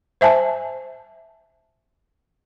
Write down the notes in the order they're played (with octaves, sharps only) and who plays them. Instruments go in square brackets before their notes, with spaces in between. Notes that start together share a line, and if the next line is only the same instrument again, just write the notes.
[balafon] C5 E5 G#5 A5